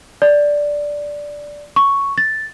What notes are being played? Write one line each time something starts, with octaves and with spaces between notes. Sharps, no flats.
D5
C#6
A6